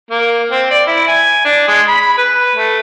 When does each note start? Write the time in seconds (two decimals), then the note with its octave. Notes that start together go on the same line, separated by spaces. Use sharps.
0.10 A#3
0.51 C4
0.70 D5
0.86 E4
1.08 G#5
1.45 D4
1.67 G#3
1.88 B5
2.18 B4
2.56 A3